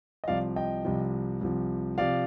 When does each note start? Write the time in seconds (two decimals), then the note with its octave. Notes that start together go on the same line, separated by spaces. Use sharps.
0.24 D#5
0.28 C2 C3 F3 D5 F5
0.56 D#5 G5
0.85 C2 C3 F3
1.41 C2 C3 F3
1.98 C3 F3 D5 F5